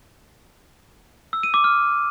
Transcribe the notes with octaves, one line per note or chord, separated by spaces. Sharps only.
E6
D#7
D6
F6